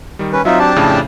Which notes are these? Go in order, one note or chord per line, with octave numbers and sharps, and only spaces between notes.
D#3 G3
C#4 B4
F#3 C4 D#4 F4 E5
D4 G4 A5
F2 A2 C#3